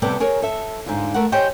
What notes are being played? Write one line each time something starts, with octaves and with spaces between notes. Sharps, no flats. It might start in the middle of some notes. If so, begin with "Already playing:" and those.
C3 G3 B3 G4 A4 D5
G#4 A#4 C#5
A4 E5
G#2 D3 F4
A3 A#4 F#5
G4 G#4 C5 C#5 D#5 G5